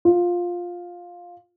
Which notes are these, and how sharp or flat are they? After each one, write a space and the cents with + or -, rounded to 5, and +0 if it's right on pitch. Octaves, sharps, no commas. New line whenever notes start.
F4 +10